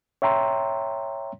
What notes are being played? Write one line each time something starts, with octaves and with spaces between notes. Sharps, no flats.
C#5 E5 G5 A#5 C6